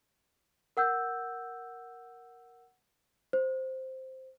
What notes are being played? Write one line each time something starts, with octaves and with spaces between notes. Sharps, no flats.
A#4 F#5 E6 G6
C5